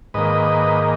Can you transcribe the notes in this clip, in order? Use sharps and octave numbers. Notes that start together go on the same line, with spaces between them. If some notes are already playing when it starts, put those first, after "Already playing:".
G#2 D#3 A#3 B4 D#5